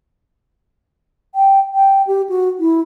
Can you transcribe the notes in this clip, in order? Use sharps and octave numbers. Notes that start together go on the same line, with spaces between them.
G5
G5
G4
F#4
E4